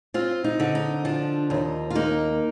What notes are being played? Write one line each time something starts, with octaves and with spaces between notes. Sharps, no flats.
C4 F4
D#4
D3
D#4
F3 D4
D#2 D#4
F4
A#3 D#4